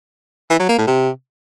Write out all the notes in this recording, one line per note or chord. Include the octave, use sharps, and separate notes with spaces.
E3
F#3
A#3
A2
C3